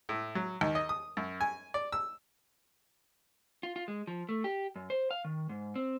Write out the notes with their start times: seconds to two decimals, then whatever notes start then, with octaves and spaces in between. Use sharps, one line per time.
0.09 A2
0.35 F#3
0.61 D#2
0.75 D#5
0.89 D#6
1.17 F#2
1.41 G#5
1.74 D5
1.92 E6
3.63 F4
3.76 F4
3.88 G#3
4.07 F3
4.29 A3
4.44 G4
4.76 F#2
4.90 C5
5.11 F5
5.25 D#3
5.49 G#2
5.75 C4